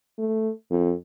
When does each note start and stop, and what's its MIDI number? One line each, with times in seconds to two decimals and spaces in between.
0.19 0.50 57
0.71 0.94 41